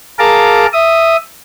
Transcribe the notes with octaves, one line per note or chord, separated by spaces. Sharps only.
G#4 A#4 F5 A5 A#5 D6
E5 D#6